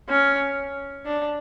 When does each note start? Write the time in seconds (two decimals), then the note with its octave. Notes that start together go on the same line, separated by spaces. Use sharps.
0.09 C#4
1.06 D4